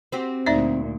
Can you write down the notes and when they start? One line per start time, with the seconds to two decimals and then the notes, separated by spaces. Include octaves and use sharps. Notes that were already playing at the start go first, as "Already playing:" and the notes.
0.12 C4 F#4 G4
0.46 D2 A#2 D#4 D5 E5